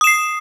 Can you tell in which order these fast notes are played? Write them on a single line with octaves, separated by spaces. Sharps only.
D#6 E7 C7